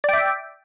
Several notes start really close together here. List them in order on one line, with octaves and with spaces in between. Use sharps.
D5 G5 E5